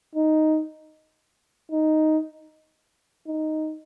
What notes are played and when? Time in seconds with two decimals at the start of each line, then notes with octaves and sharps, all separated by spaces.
0.15 D#4
1.72 D#4
3.28 D#4